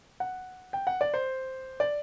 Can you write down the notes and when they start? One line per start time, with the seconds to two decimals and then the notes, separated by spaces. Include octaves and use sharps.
0.20 F#5
0.73 G5
0.87 F#5
1.01 D5
1.14 C5
1.80 D5